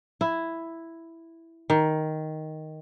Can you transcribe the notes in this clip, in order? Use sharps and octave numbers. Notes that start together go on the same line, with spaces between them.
E4
D#3